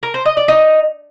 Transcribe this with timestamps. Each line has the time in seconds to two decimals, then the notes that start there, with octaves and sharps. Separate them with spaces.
0.03 A#4
0.14 C5
0.25 D#5
0.37 D5
0.48 D#4